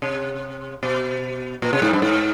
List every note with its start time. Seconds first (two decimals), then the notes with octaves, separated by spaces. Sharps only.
0.02 C3
0.83 B2
1.62 A#2
1.73 C3
1.82 G#2
1.93 G2
2.02 G#2